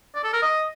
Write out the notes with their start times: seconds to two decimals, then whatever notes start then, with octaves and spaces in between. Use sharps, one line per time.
0.15 D5
0.24 A4
0.33 A#4
0.42 D#5